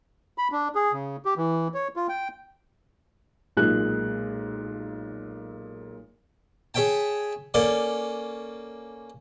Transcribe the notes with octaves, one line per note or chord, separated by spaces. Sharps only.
B5
D4
G#4
C#3
G4
E3
C#5
F4
G5
B1 A#2 G#3 F#6
G#4 C#5 E5 G5 A5
A#3 C#4 A4 D5